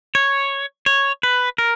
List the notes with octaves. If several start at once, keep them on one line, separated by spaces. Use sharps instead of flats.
C#5
C#5
B4
A#4